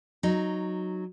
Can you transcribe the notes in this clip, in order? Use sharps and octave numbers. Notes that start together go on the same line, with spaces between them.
F#3 D#4